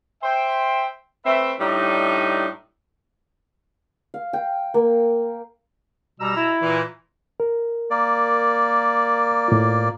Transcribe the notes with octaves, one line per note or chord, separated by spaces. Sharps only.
C5 E5 G5
A3 C4 B4 E5
A2 G3 D4 D#4
F5
G5
A#3
B2 G3 A#5 E6
E4
A#2 E3
A#4
A#3 D5
A2 F4